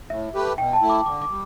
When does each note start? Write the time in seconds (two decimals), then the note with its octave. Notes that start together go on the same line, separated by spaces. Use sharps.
0.10 A2 E5
0.34 A3 G4 B4
0.58 B2 G5
0.73 A5
0.82 A3 E4
0.89 D6
1.06 D3 D6
1.22 D6
1.30 G3